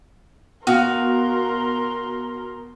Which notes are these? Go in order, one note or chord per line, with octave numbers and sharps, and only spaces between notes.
B2 F#4 A#4 F5 C6